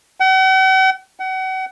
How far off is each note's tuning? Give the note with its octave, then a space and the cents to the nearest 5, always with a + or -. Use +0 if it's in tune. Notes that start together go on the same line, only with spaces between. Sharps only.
F#5 +45
F#5 +35